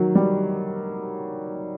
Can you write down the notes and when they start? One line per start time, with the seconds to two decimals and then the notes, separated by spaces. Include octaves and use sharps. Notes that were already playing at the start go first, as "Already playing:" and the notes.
Already playing: D#3 F#3
0.15 G3